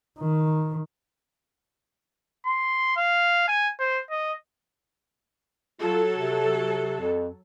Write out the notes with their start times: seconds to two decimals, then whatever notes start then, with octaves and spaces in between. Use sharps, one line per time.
0.20 D#3
2.46 C6
2.97 F5
3.48 G#5
3.79 C5
4.10 D#5
5.81 F#3 F4 A4
6.16 C3
7.00 F2